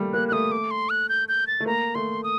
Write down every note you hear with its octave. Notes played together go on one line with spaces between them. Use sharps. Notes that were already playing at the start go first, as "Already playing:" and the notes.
Already playing: G3 A3 A#3
A#3 F#6
F#6
A3 D#6
D6
C6
F#6
G6
G6
A6
A3
A#3 A#5
A3 C6
D#6